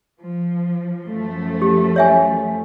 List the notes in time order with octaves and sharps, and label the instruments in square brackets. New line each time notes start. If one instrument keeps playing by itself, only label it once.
[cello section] F3
F#2 F3 A3
[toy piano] G4
C#5 E5 G#5